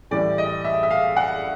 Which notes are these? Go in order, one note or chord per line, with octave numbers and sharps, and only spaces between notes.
A2 E3 G3 D5
D#5
E5
E5
F5
F#5